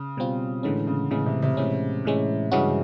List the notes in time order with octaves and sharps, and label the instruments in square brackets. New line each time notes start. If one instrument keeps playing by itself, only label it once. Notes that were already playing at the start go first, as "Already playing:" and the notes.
Already playing: [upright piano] C#3
[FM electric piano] B2 G3 C4 F4
[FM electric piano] A2 E3 G#3 C#4 [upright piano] D3
[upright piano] C#3
[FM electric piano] A2 E3 G#3 C#4 [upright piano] C#3
[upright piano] C3
C3
[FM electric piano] A2 E3 G#3 C#4
A2 E3 G#3 C#4
[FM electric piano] G2 E3 G#3 C#4 F#4 [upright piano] C#3